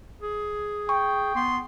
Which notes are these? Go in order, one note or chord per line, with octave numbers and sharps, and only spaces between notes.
G#4
G5 C#6
B3 C6